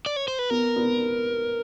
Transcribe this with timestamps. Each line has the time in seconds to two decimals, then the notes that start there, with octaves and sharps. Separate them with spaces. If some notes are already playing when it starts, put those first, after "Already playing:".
0.06 D5
0.16 C#5
0.28 C5
0.39 B4
0.50 B3 A#4
0.76 B3